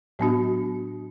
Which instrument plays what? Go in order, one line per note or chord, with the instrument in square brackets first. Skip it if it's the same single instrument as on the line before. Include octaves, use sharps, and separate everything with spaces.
[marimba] A2 F#3 B3 D4 F#4